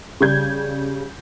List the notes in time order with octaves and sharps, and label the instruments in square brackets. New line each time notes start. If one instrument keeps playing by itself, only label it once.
[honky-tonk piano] C#3 G3 G6 G#6